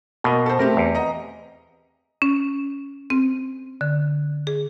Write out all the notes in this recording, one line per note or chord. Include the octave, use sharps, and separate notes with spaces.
B2 A#3 D#5
A4 C5
A3 C4 G4 A#4
E2
D#5 A#5
C#4
C4
D3
G#4